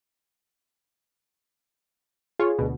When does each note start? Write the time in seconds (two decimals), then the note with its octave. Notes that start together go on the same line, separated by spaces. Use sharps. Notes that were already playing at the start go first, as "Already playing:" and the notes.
2.40 F4 G#4 C#5
2.58 D2 B2